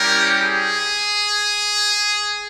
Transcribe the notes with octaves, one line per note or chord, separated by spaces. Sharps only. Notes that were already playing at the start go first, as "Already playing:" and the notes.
Already playing: G3 C#4 E4 G4 A#4
G#4